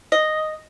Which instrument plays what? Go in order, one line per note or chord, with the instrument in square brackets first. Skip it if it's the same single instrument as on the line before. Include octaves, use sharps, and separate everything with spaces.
[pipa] D#5